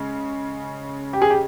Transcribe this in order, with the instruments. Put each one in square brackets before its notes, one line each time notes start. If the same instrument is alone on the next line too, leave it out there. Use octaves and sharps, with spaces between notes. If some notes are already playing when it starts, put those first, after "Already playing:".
Already playing: [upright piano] C#3 G#3 C#4
[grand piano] G4
G#4
G4